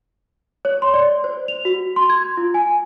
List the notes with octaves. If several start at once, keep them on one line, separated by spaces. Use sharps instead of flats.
C#5
C6
D5
C5
F7
F#4
C6
G#6
F4
G#5